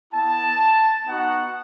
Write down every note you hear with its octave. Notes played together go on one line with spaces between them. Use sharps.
B3 E4 A5
B3 D#4 F#4 F#5